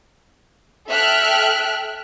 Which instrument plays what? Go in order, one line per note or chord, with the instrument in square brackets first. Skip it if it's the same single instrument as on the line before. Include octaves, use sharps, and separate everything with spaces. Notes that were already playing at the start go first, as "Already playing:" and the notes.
[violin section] A4 E5 G5 F6 F#6